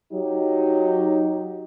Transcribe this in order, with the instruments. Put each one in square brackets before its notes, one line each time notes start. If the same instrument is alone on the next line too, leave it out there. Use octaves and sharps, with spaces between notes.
[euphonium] F#3 [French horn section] D#4 G4